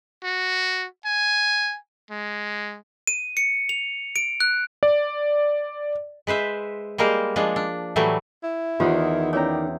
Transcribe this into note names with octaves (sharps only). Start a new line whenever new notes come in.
F#4
G#5
G#3
D#7
C#7
F7
D7
F#6
D5
G#3 B4 C5 E5
G3 G#3 A#3 A#4 C5
F3 G#3 D4
D4
A2 E3 F#3 G3 A3
E4
E2 D#3 F4 G4 C5 F#5 C6
C#4 E4 C#5 D5 G5 A#5